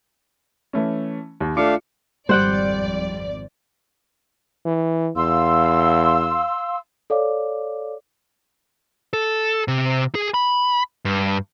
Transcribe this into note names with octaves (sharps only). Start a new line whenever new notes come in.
E3 A3 C#4
D#2
A3 D4 F4 F5 D6 C#7
G#1 F2 G3 C5 D5 F#5 G5
E3
E2 F5 C6 E6
A4 C#5 D5 F5 D6
A4
C3
G#4
B5
G2